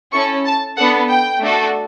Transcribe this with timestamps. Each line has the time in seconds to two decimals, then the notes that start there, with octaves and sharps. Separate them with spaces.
0.12 C#4 E4 A4 C#6
0.45 A5
0.77 B3 D4 A4 F#5
1.09 G5
1.41 A3 D4 F#4 A4